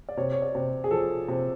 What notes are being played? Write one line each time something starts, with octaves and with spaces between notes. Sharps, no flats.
D5
C3 C#5
C#5
D5
C3
G#4
F3 A4
C3